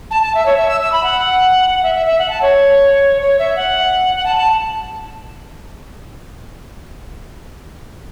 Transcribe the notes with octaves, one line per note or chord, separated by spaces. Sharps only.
A5
A5
E5
C#5
E5
E6
E6
B5
F#5
E5
E5
E5
F#5
A5
C#5
C#5
E5
F#5
F#5
A5
A5